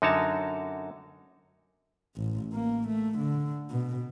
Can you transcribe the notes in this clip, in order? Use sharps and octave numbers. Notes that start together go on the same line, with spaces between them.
F#2 D3 D#4 F#4 C#5 A5
A1
A#3
A3
D3
B2